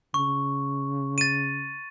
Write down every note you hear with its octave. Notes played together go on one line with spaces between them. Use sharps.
C#3 C#6
A6 D#7